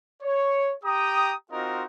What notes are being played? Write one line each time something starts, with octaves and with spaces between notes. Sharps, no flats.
C#5
G4 G5 A#5 D#6
C4 D#4 F4 F#4 A#4 D#5